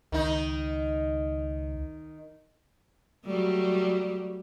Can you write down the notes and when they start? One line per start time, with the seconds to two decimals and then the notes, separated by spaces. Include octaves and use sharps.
0.12 C#2 D#3 D#4
3.26 F#3 G3 A3